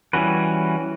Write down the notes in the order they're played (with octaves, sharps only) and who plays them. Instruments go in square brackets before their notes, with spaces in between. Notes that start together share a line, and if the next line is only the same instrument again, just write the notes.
[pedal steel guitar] E3 G3 C#4 F#4 B4